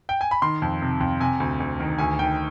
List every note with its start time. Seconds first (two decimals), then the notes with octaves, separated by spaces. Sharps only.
0.09 G5
0.21 G#5
0.31 B5
0.42 D#3 C6
0.62 F2
0.82 C3
1.01 F2
1.20 C3 G#5
1.40 D2
1.60 D2
1.80 D#3
1.98 D2 G#5
2.19 D#3 G5